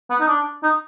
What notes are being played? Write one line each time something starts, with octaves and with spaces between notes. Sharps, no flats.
B3
D#4
D4
D#4